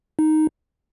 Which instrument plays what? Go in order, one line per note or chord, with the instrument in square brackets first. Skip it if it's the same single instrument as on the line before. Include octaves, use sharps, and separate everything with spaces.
[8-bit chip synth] D#4